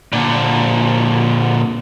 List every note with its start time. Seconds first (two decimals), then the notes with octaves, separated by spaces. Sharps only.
0.13 A#2 D3